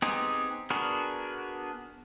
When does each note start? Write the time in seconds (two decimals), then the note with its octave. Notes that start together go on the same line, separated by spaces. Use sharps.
0.02 B3 C4 D#4 G4 G#4
0.70 B3 D4 F#4 G#4 A#4